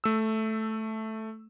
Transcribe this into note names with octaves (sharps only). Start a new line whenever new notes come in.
A3 E6